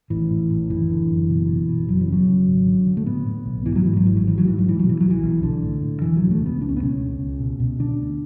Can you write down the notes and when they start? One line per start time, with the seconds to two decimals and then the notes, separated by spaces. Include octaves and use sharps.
0.10 A1 E3
0.30 A2
0.50 A1
0.70 F#1 E3
0.90 D3
1.10 F#1
1.29 B2
1.48 B2
1.68 B2
1.88 F#1 F#3
2.01 E3
2.07 C#3
2.12 F#3
2.27 C#3
2.47 G#1
2.67 D3
2.87 D3
2.97 A3
3.06 A2 B3
3.26 A2
3.46 B1
3.65 G#2 E3
3.75 F#3
3.85 G#2 E3
3.97 F#3
4.05 G#1 E3
4.17 F#3
4.24 A1 E3
4.38 F#3
4.45 G#2 E3
4.58 F#3
4.64 A1 E3
4.79 B2 F#3
4.89 E3
5.00 B1 F#3
5.10 E3
5.23 B1
5.43 B1 D3
5.63 A2
5.82 A2
6.02 E1 E3
6.17 F#3
6.22 D2
6.31 A3
6.41 C#3 B3
6.60 C#2 D4
6.69 C#4
6.77 B3
6.81 B2 C#4
7.00 C#2
7.20 C#2
7.40 B2
7.60 B2
7.80 D3 D4
7.98 D2